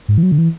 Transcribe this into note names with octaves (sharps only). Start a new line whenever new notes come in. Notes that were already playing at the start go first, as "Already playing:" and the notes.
G#2
E3
F#3
D3
E3